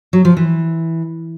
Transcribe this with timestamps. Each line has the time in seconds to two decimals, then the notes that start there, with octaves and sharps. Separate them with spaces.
0.13 F#3
0.25 F3
0.37 E3